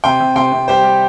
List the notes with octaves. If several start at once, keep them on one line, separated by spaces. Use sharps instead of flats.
C3 G5 C6
C3
C3 G5 C6
C3
G3 G4 C5
G3